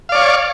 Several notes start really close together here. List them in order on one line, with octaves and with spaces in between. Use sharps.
F5 D5 C#5